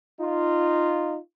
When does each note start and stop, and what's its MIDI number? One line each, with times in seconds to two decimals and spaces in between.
0.20 1.17 63
0.20 1.17 65